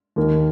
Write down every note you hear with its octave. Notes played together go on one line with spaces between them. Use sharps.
D#2 D#3 A#3